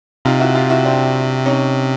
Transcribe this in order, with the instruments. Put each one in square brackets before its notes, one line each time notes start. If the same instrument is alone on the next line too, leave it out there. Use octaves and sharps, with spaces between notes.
[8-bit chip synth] C3 [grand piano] D#4 F4
[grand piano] E4 F#4
F4 G4
E4 F#4
C4 D4
C#4 D#4